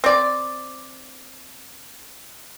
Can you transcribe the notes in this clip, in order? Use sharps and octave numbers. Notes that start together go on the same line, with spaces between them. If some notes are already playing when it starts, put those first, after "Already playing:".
C4 D5